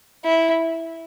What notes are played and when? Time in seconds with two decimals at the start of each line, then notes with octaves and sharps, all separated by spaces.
0.25 E4